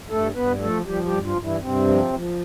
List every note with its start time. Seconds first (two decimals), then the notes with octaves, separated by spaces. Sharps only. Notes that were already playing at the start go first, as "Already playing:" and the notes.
0.09 G2 A3 A4
0.35 G2 B3 B4
0.60 F3 A3 A4
0.85 F3 G3 G4
1.05 G3 G4
1.12 G2
1.24 F3 F4
1.37 G2
1.43 E3 E4
1.62 G2 C3 C4
1.88 F3
2.13 F3